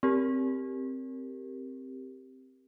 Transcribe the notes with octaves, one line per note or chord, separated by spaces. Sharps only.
C4 G4 A#4